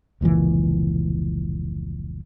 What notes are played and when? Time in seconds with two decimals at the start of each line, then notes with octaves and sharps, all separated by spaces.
0.21 F1 C#2 A#2 E3